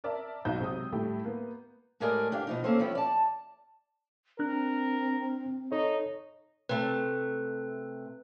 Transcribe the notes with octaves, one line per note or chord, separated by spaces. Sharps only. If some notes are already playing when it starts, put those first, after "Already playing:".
A#4 D5 E5 A5
B1 G#2 F#4 F5 G6
C3 F#3 G#3 D#6
A2 G3 A3 E4 G4
A#3 B3
A2 G#3 G4 G#4 A#4 D5
G#2 D4 G4 F5
B2 F3 D#4
A#3 C4 C#4 A4 C5
F3 G3 B3 C#4 E4
D5 A5
C4 D4 A#4 F#6
D#4 A4 C#5
C3 A3 B4